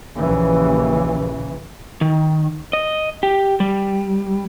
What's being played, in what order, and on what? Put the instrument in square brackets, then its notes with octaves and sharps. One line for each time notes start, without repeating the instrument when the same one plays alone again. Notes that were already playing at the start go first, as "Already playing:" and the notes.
[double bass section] A#1 D#2 C#3 E3
[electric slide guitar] D#3
D#5
G4
G3